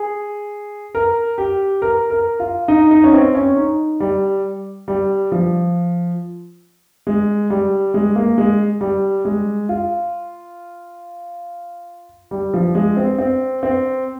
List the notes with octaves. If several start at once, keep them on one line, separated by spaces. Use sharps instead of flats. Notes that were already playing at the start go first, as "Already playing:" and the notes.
Already playing: G#4
A#4
G4
A#4
A#4
F4
D#4
D#4
C#4
C4
C#4
D#4
G3
G3
F3
G#3
G3
G#3
A#3
G#3
G3
G#3
F4
G3
F3
G#3
C4
C4
C4